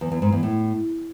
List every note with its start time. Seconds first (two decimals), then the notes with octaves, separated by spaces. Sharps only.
0.01 E2
0.12 E2
0.22 G#2
0.32 E2
0.43 A2